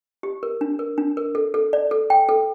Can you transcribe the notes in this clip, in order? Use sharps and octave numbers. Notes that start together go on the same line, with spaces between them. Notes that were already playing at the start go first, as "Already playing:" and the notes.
G4
A#4
D4
A#4
D4
A#4
A4
A4
D5
A4
G5
A4